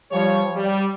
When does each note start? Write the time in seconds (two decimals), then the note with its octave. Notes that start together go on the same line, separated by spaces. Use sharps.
0.12 F3 G3 C#5
0.55 G3